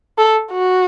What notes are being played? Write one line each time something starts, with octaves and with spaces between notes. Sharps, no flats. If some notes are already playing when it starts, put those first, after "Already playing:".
A4
F#4